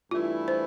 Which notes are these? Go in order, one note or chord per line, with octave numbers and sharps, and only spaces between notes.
G2 E3 A3 E4 F4
C5